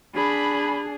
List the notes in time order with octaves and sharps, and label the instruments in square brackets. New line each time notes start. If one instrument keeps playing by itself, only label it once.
[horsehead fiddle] D4 G#4 [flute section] B5